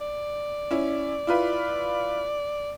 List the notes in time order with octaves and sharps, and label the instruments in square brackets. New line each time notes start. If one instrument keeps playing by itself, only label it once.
[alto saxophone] D5
[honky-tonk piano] C#4 E4
E4 F4 B4